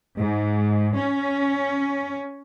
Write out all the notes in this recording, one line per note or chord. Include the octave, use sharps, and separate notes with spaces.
G#2
C#4